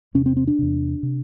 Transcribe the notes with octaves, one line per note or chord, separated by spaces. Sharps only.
E2 C3 C#4
C4
C4
D4
E2 C3
C3